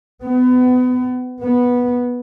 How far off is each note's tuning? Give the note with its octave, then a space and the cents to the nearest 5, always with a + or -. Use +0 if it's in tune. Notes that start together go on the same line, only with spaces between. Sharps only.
B3 +30
B3 -10